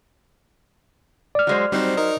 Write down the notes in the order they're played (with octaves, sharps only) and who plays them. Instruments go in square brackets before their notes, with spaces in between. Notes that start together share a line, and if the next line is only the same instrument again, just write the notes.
[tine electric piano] D5 F6
[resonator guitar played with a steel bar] F#3 G#3 C5
[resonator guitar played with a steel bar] F#3 C5 [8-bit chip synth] G3 C4 D#4
[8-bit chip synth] D#4 A#4 D#5